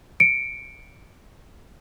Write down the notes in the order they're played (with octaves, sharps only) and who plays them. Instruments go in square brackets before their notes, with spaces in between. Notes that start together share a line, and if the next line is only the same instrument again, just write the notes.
[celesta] C#7 D7